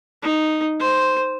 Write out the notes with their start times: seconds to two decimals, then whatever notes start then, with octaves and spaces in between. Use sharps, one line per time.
0.23 D#4
0.80 C5